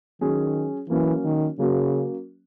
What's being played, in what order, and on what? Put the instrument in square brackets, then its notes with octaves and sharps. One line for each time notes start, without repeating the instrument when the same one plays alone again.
[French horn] D#3 [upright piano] F#3 C#4 G#4
[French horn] E3 [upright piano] F#3 A#3 C#4 F#4
[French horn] D#3
[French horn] C#3 [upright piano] F#3 A#3 C#4 F#4